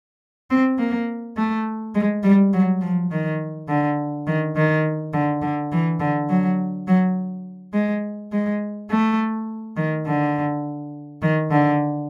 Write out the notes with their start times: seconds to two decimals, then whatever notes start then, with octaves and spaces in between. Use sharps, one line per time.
0.51 C4
0.78 A#3
1.37 A3
1.95 G#3
2.23 G3
2.53 F#3
2.81 F3
3.11 D#3
3.68 D3
4.27 D#3
4.56 D#3
5.14 D3
5.42 D3
5.72 E3
6.00 D3
6.29 F#3
6.88 F#3
7.73 G#3
8.32 G#3
8.90 A3
9.77 D#3
10.06 D3
11.22 D#3
11.51 D3